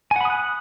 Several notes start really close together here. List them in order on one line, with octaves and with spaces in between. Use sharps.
G#5 F#5 B5 D#6 F#6